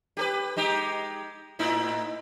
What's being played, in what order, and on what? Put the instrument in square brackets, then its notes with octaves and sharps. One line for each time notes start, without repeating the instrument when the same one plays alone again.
[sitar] G4 A4 B4
G#3 D#4 G4
A2 D#4 E4